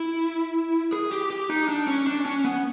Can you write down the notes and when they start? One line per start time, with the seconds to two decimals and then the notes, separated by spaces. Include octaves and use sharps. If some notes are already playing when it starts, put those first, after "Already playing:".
Already playing: E4
0.93 G#4
1.12 G4
1.30 G4
1.50 D#4
1.69 D4
1.88 C#4
2.07 D4
2.26 C#4
2.45 B3